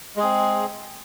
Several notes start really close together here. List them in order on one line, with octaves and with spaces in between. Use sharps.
G#3 G#4 C4